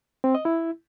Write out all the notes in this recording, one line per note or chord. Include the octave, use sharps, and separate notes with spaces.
C4
D#5
E4